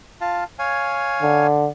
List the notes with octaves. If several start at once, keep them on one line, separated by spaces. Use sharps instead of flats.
F4 F5 A5
C#5 F5 G#5
D3